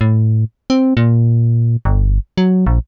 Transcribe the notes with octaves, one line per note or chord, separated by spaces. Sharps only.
A2
C4
A#2
G1
F#3
A#1